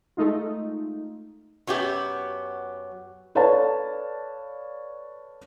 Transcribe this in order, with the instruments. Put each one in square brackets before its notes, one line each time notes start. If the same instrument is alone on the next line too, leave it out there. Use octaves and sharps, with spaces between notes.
[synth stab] G#3 A3 D#4 F4
[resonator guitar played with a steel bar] F#2 F#3 B3 G4
[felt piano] A4 B4 C#5 D5 F5 A5